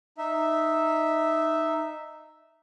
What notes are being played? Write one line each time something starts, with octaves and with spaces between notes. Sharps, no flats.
D#4 E5